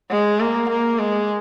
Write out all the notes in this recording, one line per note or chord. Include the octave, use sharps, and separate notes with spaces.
G#3
A#3
A#3
G#3